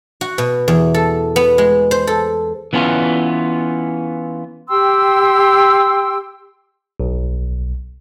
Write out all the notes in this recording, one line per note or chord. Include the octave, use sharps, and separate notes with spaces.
F#4
B2
E2
A4
B3
G#3
C5
A4
E3 B3 C#4 F4
G4 G5 C6 E6
B1